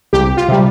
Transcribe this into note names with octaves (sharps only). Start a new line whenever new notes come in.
C2 G4
F4
C3 G3